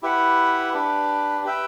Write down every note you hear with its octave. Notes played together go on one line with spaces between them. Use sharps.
E4 G4 B4 F#5
D4 G4 B4
G4 B4 E5 G5